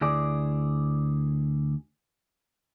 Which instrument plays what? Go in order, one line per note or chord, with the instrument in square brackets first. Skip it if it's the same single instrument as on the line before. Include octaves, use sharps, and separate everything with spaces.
[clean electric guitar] D2 E4 G#4 D5